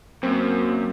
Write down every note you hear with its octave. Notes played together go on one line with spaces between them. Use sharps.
F#2 A#3 C4